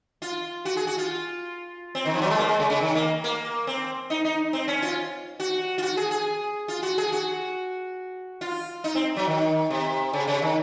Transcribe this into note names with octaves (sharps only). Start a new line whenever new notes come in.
F4
F#4
G#4
F#4
F4
C4
D#3
F3
F#3
G#3
A#3
G#3
C#3
C#3
D#3
A#3
A#3
C4
D#4
D#4
C4
C#4
F4
F#4
F4
F#4
G#4
G#4
F4
F#4
G#4
F#4
F4
D#4
C4
F#3
D#3
C3
C#3
C#3
D#3